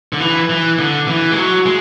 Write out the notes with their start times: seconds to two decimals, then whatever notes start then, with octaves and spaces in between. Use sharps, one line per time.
0.13 D3
0.20 E3
0.50 E3
0.79 D3
1.08 E3
1.31 G#3
1.36 F#3
1.66 G#3